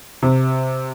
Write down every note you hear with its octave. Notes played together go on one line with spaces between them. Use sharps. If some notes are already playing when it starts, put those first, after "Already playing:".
C3